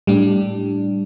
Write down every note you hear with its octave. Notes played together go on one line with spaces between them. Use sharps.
A2 G3 D4